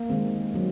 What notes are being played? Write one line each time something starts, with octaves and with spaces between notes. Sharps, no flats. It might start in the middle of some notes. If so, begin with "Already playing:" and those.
Already playing: A#3
D#3 G#3 C4
D#3 F#3 C4